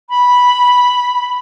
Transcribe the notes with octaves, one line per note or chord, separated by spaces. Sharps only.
B5